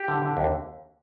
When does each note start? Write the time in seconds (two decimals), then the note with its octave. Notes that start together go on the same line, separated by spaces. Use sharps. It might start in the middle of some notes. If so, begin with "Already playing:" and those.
Already playing: G4
0.08 D3
0.22 D3
0.37 D#2